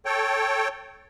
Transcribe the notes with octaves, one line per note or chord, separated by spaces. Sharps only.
A4 C#5 G5